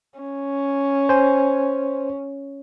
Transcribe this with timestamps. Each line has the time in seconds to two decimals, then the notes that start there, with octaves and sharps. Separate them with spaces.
0.19 C#4
1.09 C5 G#5